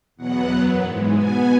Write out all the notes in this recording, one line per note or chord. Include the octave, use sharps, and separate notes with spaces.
E2 B2 F#3 B3 F#5
F#2 F#3 B3 F#5
G#2 E3 G#3
B2 B3 G#5